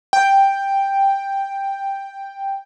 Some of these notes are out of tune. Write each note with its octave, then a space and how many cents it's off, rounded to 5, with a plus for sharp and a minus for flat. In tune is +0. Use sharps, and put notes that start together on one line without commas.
G5 +5